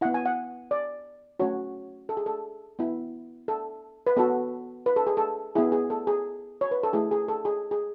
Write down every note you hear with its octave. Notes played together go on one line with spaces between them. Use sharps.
B3 E4 F#5
G#5
F#5
D5
A3 C#4 F#4 C#5
A4
G#4
A4
B3 E4
A4
B4
B3 F#4 A4
B4
A4
G#4
A4
B3 E4 G#4
G#4
A4
G#4
C#5
B4
A4
A3 E4 G#4
G#4
A4
G#4
G#4